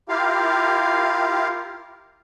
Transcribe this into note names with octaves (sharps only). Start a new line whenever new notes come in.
E4 F4 G4 A#4 F5